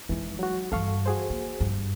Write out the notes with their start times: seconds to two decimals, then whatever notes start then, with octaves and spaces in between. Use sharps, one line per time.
0.09 F2 E3 G#3 D#4
0.39 F#3 F#4
0.72 G2 E3 A4 F5 C#6
1.06 F#4 G#4 C5
1.30 A#3
1.61 G2